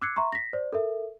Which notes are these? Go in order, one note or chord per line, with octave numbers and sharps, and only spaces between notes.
D6 E6 F#6 G#6 C7 C#7
E5 A#5 C6 C#6
A#6 B6
C5 D5
A4 A#4 E5